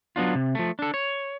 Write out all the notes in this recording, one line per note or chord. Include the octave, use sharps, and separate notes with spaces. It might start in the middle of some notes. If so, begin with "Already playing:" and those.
F#3 B3 D4 F4
C3
F3 A3
D4 A4
C#5